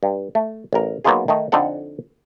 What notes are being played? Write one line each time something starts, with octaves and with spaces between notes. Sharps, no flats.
G2
A3
A1 A#4
F#3 A#3 B3 D#4 F4 G#4
D#3 A3 D#4
F2 D3 D#4 A4 F#5